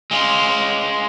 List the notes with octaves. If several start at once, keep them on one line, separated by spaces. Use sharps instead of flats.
G#3 F4